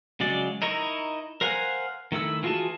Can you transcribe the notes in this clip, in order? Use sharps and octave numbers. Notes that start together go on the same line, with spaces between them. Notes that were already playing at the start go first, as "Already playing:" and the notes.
C#3 F#3 G#3 D5
D#4 E4 A#4 D#5 C#6
A#4 C5 F5 F#5 G#5
D#3 A3 E4 E6
E3 F4 F#4 G#4 A5